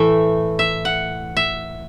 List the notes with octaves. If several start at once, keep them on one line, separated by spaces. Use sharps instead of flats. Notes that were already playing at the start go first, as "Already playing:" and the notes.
Already playing: A2 E3 A3 E5
E5
F#5
E5